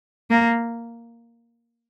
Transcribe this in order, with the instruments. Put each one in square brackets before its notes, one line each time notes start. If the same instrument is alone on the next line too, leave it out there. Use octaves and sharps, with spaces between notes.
[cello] A#3